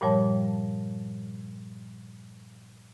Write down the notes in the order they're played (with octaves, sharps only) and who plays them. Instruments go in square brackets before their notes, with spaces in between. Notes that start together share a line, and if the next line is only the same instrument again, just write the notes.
[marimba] G2 A#2 F3 G3 C#5 A5